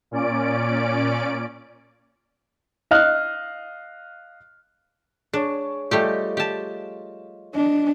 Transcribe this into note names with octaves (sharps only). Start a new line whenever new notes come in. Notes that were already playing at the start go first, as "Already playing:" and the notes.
A#2 C#4 D5 D7
D#5 F5 F6 F#6
D4 G#4 C#5
G3 A3 F4 G4 D#5
G4 A5
D4 D#5